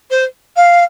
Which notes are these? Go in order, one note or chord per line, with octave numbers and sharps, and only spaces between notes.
C5
F5